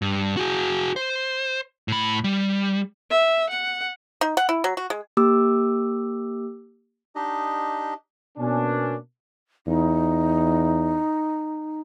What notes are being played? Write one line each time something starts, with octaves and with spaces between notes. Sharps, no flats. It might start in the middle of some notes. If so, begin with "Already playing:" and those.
G2
F#4 G#4
C5
A2 B5
G3
E5
F#5
D#4
F#5
E4
F#3
F#4
G#3
A#3 G4 D6 E6
D4 D#4 G4 D#5
B2 A#3 C#4 D4
E2 D#4